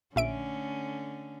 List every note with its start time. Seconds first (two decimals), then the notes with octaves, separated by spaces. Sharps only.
0.16 A#1 D3 A3 C#4 E5 D7